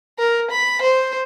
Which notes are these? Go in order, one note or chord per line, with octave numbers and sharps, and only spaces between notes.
A#4
B5
C5